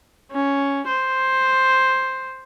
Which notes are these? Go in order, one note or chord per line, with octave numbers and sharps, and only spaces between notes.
C#4
C5